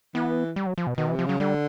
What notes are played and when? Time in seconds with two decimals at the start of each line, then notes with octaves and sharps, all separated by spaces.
0.15 E3 B3
0.56 G3
0.66 F#3
0.78 F3
0.87 B2
0.97 B2 D#3
1.08 E3
1.12 C3
1.19 F3
1.25 C#3 F#3
1.40 D3 G3